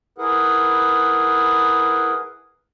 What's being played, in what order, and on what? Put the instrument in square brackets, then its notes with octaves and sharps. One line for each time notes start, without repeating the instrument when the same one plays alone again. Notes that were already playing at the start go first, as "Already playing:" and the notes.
[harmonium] E4 G#4 A#4 B4 F#5